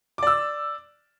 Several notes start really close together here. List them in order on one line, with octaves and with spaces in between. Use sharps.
D6 D5 E6